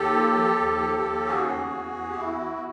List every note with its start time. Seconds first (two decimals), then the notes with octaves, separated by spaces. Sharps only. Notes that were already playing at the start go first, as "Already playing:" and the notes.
Already playing: D#2 G4 A4
0.13 F3
0.35 F3
0.59 D#2
0.81 F3
1.03 D#2
1.26 C#3 F#4 G#4
1.48 E2
1.70 E2
1.94 E2
2.10 G4
2.16 E2 E4 F#4
2.38 E2